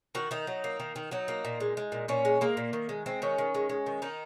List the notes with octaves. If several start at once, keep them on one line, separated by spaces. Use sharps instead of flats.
D#3 F#4
D#3 D#4
F#3
A#3
D#3
D#3
F#3 D#4
A#3
A#2
G#3
G#3
A#2
A#2 C#4
G#3
G#3 A#3
A#2
D#3
G#3
G#3 C4
D#3 C#4
D#3
G#3
G#3
D#3
D#3 D#4